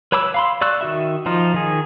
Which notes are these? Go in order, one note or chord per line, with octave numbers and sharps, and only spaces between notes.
B4 C#5 B5 D6 E6
F5 B5 C6
D5 C#6 E6 F#6
D#3 F#4 E5
F3 D#4 F4
D#3 G#4